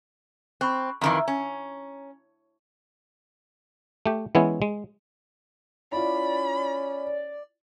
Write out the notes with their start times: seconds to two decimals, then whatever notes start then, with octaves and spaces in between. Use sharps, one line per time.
0.61 C4 B5 C#6 F#6
1.01 F2 D#3 E3 A#5
1.28 C#4
4.06 A3 G4
4.35 E3 G#3 B3 C#4 E4 C#5
4.62 G#3
5.92 C#4 E4 F4 D5 B5